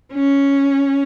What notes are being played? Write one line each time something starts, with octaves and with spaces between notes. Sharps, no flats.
C#4